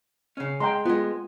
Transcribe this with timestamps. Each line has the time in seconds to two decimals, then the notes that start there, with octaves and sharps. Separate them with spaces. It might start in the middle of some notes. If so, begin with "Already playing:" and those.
0.37 C#3 C#4
0.60 G#3 G5 A#5 C6
0.85 G#3 B3 F4